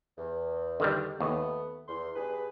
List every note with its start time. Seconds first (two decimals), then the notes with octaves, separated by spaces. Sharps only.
0.18 E2
0.80 D3 D#3 G3
1.20 D#2 A3 B3
1.88 E2 C6
2.16 G2 G#4 B4